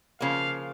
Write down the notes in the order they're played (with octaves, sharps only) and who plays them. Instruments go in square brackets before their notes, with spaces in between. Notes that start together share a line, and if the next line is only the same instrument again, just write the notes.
[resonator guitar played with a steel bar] C#3 F3 A#3 [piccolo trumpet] F5